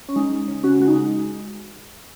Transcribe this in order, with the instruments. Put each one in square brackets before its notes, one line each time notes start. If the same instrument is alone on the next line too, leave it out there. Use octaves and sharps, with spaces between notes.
[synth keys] C#4
G#3 D#4
G#3
C#3
C#3 C#4 F#4
G#3 F#4
D#4
G#3